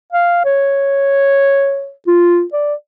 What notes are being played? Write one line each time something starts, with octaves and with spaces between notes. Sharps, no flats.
F5
C#5
F4
D5